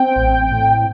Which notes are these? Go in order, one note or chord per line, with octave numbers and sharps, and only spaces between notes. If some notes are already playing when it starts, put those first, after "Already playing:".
Already playing: C4 G5
A1
A2